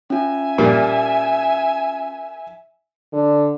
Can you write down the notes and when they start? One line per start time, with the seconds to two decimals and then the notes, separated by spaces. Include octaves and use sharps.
0.10 C#4 F4 E5 G#5
0.58 A#2 G3 A#3
3.13 D3